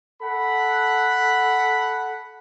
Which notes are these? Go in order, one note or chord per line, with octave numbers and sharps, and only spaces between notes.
A4 F#5 B5